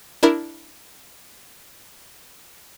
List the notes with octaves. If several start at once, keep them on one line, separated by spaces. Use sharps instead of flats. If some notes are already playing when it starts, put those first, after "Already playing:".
D4 E4 A#4